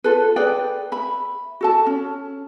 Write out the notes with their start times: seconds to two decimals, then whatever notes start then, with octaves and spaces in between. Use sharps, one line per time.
0.04 F4 A4 B4
0.36 G#4 B4 D5 G5
0.92 E5 B5
1.61 F#4 A4 A5
1.86 C#4